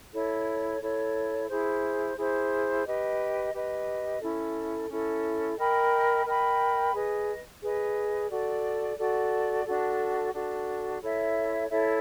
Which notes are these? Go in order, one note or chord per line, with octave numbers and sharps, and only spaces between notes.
E4 A4 C#5
E4 A4 C#5
E4 G#4 C5
E4 G#4 C5
G4 B4 D#5
G4 B4 D#5
C#4 E4 A4
C#4 E4 A4
A#4 D#5 G5 B5
A#4 D#5 G5 B5
G#4 B4 D#5
G#4 B4 D#5
F#4 A4 D5
F#4 A4 D5
D4 F#4 A4
D4 F#4 A4
E4 A4 C#5 E5
E4 A4 C#5 E5